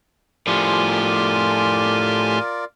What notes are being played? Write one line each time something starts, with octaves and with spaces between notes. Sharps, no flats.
A2 F3 F4 G4 A#4 D5 G#5 C6